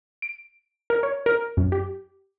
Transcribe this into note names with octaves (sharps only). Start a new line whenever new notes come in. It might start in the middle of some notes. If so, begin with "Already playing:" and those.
D7
A#4
C#5
A#4
F#2
G4